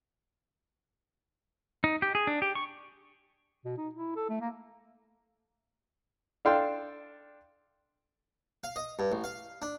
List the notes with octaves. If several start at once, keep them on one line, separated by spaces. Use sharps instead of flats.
D#4
G4
G#4
D4
G4
C#6
B2
D#4
E4
A4
A3
A#3
D4 A4 F5 G5 C6
F5
D#5
G2
A1
F5
D4